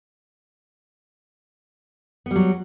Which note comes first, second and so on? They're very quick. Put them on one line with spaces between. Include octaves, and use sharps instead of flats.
B3 G3 F#3